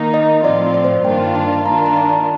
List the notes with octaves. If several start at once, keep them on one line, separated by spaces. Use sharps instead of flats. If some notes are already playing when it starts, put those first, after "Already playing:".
Already playing: D#3 A#3 D#4
D#5
A2 F3 C4 F4 D5
D5
C5
G2 D#3 A#3 D4 F4 G5
A5
D#3 A#3 D4 F4 A#5
A5
A#5
A5